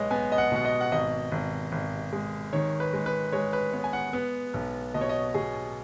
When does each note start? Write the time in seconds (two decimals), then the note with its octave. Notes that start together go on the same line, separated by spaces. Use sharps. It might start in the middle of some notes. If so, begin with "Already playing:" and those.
Already playing: B1 G#3 B4 C#5 D#5
0.11 B3 G#5
0.32 D#5
0.38 F#5
0.52 B2 F#5
0.65 D#5
0.81 F#5
0.92 G#1 D#5
1.32 G#1
1.72 G#1
2.13 G#3
2.53 D#3 C#5
2.80 B4
2.93 G#3
3.06 B4
3.32 G#3 C#5
3.53 B4
3.73 B3 C#5
3.84 G#5
3.93 F#5
4.13 B3
4.54 B1
4.94 B2 D#5
5.01 C#5
5.09 D#5
5.34 B2 G#4